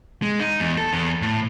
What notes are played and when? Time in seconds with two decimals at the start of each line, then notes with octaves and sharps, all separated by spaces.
0.22 G#3
0.41 D#4
0.60 E2
0.78 A4
0.93 E2
1.22 A2